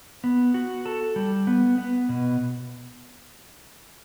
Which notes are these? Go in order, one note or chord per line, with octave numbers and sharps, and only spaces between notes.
B3
F#4
A4
G3
B3
B3
B2